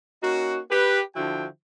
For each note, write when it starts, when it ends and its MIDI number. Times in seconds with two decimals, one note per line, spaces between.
0.23 0.59 58
0.23 0.59 61
0.23 0.59 63
0.23 0.59 66
0.71 1.01 67
0.71 1.01 71
1.15 1.46 50
1.15 1.46 53
1.15 1.46 64
1.15 1.46 66
1.15 1.46 79